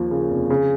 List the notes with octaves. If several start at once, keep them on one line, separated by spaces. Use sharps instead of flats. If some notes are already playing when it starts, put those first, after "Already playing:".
Already playing: D#2 F3
C#3
F1
C#3